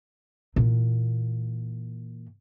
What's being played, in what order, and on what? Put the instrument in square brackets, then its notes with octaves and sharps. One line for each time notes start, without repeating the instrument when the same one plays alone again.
[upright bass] A#2 E3